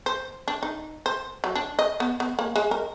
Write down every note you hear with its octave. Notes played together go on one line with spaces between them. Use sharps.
C5
D4
D#4
C5
F#3
D4
D#5
B3
B3
A#3
G#3
A#4